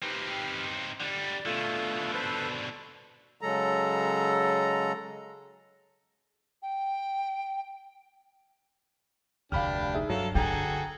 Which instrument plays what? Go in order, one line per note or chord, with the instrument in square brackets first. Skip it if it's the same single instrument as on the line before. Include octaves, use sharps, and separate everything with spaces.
[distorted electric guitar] C4 D#4 [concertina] G4 B4 F6
[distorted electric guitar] D3 G3 [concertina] D5
[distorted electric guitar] B2 D3 [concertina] A3 F4 A4
[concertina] A4 B4 C5
[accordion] C#3 F#3 G#3 A4 A#5
[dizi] G5
[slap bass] F1 D2 [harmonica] D4 G4 [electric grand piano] F5 B5 F6
[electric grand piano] D#4 G#4 E5
[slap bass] G2 [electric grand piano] F#3 [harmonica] A4 F5
[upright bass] D3 [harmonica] F#4 G#4 A4 [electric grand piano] G5 A#5